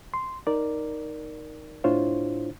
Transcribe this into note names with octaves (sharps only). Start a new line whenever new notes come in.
C6
D#4 A#4 D5
A2 D4 E4 F4 C5 C#5